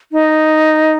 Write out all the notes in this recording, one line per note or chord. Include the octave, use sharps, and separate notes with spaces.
D#4